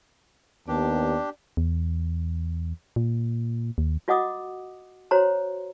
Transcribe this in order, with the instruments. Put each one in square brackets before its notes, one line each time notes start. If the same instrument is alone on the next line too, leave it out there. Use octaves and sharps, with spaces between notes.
[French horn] D#2 [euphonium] B3 [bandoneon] D4 G4 [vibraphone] D5 A5
[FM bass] E2
A#2
D#2
[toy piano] F4 F#4 D#5 F#5 D6 D#6
F#4 C5 C#5 A#5 C6